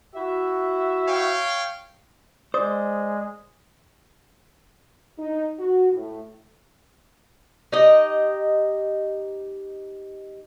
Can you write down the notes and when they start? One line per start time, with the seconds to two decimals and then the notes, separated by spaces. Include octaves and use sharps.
0.15 E4 F#4 E5
1.08 C#5 F5 G5
2.54 G#3 C5 D5 D#6
5.19 D#4
5.58 F#4
5.92 A2
7.72 D#4 G4 D#5